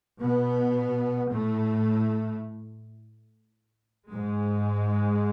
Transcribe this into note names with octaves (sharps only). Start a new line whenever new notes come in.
B2 B3
A2 A3
G#2 G#3